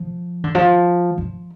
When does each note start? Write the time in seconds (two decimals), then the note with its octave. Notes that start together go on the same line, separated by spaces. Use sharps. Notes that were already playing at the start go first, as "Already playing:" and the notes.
Already playing: F3
0.44 D3
0.55 F3
1.18 F3